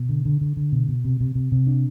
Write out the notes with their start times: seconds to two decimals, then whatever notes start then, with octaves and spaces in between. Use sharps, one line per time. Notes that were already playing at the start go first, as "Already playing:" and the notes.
Already playing: B2
0.09 D3
0.25 D3
0.41 D3
0.57 D3
0.72 B2
0.89 B2
1.05 C3
1.20 C3
1.35 C3
1.52 C3
1.67 D4